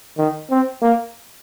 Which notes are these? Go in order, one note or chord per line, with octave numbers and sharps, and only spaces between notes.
D#3
C4
A#3